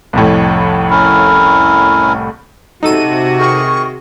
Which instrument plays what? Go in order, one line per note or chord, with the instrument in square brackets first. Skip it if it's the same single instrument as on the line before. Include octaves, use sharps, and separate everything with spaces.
[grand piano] C2 F2 A2
[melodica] C#4 E4 A#4
[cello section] C3 F#4 [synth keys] D#4 A4 D#7
[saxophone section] D#3 G#4 [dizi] C#6